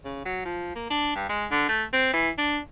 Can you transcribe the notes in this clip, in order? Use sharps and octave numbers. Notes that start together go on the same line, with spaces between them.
C#3
F#3
F3
A#3
D4
G2
G#3
D3
A3
C4
E3
D4